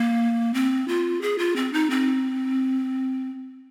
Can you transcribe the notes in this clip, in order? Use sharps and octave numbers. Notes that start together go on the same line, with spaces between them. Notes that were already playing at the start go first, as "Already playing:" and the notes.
Already playing: A#3
C4
F4
G#4
F4
C4
D#4
C4